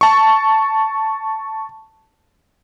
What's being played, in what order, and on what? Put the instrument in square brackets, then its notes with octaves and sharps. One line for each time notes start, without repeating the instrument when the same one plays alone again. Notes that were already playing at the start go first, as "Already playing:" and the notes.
[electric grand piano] A5 C#6